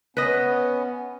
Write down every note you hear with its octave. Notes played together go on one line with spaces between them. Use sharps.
B3 C#4 B4 D#5